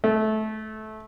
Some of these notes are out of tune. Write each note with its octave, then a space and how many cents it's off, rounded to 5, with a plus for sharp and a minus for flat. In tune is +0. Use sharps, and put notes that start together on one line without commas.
A3 -20